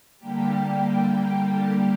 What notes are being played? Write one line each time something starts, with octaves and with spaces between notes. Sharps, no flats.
D3 G3 A#3 G4